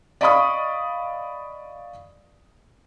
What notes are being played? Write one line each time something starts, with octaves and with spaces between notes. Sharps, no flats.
D5 D#5 F5 B5 C#6 D#6